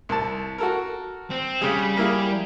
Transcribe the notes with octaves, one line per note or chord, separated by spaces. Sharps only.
C2 A5
F#4 A4 A#4
C4
C#3 G3 G#4
A#3 E4 G#4